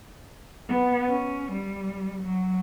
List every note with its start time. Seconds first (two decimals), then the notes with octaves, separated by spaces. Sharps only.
0.69 B3
1.09 C#4
1.52 G3
2.23 F#3